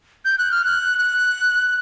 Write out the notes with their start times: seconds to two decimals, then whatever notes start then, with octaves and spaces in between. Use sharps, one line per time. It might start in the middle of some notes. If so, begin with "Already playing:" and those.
0.25 G6
0.38 F#6
0.52 F6
0.65 F#6
0.98 F#6